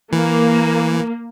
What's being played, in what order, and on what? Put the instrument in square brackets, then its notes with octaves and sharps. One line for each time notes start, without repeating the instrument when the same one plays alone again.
[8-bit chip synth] E3 [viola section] A#3